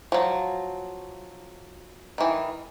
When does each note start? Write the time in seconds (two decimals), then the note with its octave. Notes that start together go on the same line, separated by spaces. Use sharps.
0.12 F3 F#3
2.18 D#3 E3